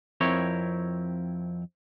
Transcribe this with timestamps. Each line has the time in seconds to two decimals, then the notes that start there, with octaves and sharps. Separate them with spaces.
0.21 F2 C4 E4 A#4 C#5